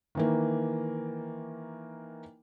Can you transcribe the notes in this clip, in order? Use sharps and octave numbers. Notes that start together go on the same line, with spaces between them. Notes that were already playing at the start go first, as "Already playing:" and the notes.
D#3 E3 A#3